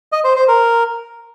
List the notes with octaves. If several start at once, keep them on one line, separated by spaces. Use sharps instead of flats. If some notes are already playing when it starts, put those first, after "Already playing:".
D#5
C5
C5
A#4